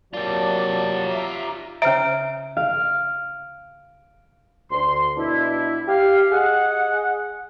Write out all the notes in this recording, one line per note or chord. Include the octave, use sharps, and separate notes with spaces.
F#3 A#3 F4 G4 D5 A5
E5 A#5 D6
C#3 C#4 C5 E5 A#5 D7
F5
D2 C6
B2 D4 E4
G4 F5
G#4 D#5 F#5